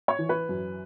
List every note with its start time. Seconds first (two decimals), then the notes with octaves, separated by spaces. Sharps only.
0.08 C#5
0.19 E3
0.29 B4
0.49 F#2